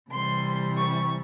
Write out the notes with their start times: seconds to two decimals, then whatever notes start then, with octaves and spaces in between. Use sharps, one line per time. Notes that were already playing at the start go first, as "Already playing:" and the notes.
0.11 C3 E3 G3 C6
0.76 C#6